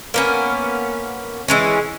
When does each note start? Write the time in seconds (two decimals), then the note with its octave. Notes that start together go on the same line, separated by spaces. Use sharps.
0.14 A#3 B3 C#4
1.48 E3 G#3 C#4